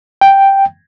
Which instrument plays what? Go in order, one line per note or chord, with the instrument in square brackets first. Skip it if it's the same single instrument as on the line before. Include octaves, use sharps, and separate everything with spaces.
[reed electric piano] G5